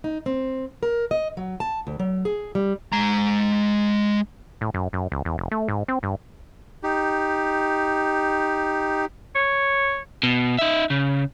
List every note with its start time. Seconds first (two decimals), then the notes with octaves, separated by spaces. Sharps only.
0.04 D#4
0.26 C4
0.83 A#4
1.11 D#5
1.37 F#3
1.60 A5
1.87 D2
2.00 F#3
2.25 G#4
2.55 G3
2.92 G#3 A#5
4.61 A2
4.74 F#2
4.93 F#2
5.12 C#2
5.25 E2
5.38 F1
5.51 A3
5.68 G#2
5.88 C4
6.03 G2
6.83 D#4 G4
9.35 C#5
10.23 B2
10.59 D#4 E5
10.90 C#3